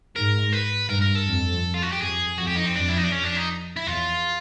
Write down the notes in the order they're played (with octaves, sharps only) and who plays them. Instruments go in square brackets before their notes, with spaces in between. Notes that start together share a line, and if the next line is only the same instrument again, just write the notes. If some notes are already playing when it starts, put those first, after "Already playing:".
[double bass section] G#2 [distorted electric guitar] A#4
[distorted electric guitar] B4
[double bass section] G2 [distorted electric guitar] A#4
[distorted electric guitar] A#4
A4
[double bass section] F2
[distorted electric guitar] F4
F#4
G4
[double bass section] F2 [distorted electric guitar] G#4
[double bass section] F2 [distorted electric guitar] F#4
[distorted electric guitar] G4
D#4
C4
[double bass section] F2 [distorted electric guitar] D4
[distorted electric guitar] E4
D#4
D4
C#4
D4
D#4
E4
[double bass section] E2 [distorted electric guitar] F4